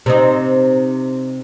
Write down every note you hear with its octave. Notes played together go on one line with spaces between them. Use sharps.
C3 C4 D#4